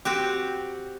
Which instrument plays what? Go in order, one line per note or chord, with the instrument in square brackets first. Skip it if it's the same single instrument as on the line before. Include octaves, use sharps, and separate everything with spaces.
[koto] C4 F#4 G4